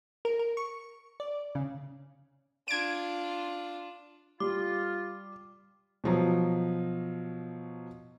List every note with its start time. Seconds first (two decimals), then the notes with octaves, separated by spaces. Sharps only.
0.25 A#4
0.39 A#4
0.57 C#6
1.20 D5
1.55 C#3
2.68 D4 F4 G#6 D7
4.40 G3 F4 D6
6.04 B2 F3 F#3